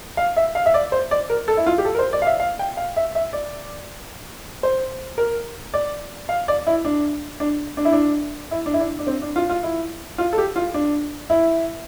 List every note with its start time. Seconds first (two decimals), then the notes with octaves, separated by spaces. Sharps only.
0.17 F5
0.37 E5
0.55 F5
0.66 E5
0.74 D5
0.92 C5
1.11 D5
1.30 A#4
1.48 A4
1.57 E4
1.66 F4
1.78 G4
1.85 A4
1.95 A#4
1.99 C5
2.13 D5
2.22 F5
2.26 E5
2.40 F5
2.59 G5
2.77 F5
2.96 E5
3.15 E5
3.33 D5
4.63 C5
5.18 A#4
5.74 D5
6.29 F5
6.48 D5
6.67 E4
6.85 D4
7.40 D4
7.77 D4
7.85 E4
7.92 D4
8.51 E4
8.66 D4
8.74 E4
8.80 D4
8.99 D4
9.07 C4
9.22 D4
9.36 F4
9.50 F4
9.63 E4
10.18 F4
10.33 A4
10.38 G4
10.56 F4
10.74 D4
11.30 E4